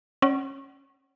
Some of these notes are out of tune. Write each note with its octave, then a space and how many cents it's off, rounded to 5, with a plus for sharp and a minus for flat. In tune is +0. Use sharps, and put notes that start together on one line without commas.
C#4 -20 D5 +0 F#5 +35